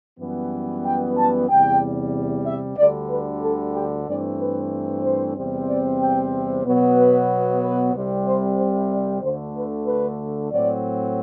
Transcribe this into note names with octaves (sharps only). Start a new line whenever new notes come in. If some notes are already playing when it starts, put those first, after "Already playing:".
F#2 E3 G3 B3
G5
A5
E2 C3 G3 G5
E5
D2 D3 G3 D5
B4
A4
G4
G2 E3 A3 C4 D5
B4
C5
E2 C3 G3 C4
D5
G5
B2 F#3 B3
B4
B4
C2 C3 G3
C5
C5
D5
D2 D3 A3 C5
B4
B4
A2 F#3 C4 D5